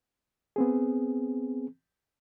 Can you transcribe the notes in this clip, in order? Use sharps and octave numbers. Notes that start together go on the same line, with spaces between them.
B3 C4 G#4